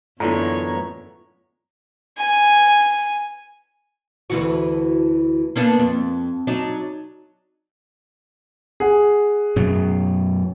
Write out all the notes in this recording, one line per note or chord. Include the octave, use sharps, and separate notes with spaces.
F#2 A2 D3 E3 B3 F4 C#5 A#5
G#5
D2 E3 F#4
A#3 B3 D4
F2
F#3 D4 D#4
G#4 F#5
F#2 B2 F#3